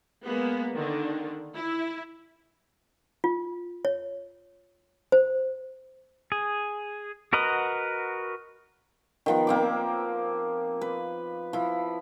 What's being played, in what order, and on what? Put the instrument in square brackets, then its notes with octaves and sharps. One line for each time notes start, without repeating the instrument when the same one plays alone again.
[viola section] G#3 A#3 B3
D3 D#3 D4
E4
[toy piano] F4
C#5
C5
[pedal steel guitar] G#4
F#4 A#4 B4 D#5 F#5
[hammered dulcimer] D#3 F3 B3
A#3 C4 D6
B4
F3 E4